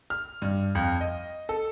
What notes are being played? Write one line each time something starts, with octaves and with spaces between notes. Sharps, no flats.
F6
G2
F2
D#5
A4